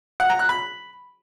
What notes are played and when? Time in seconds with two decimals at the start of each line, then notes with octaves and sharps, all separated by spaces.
0.20 F#5
0.30 A#5
0.39 F#6
0.49 B5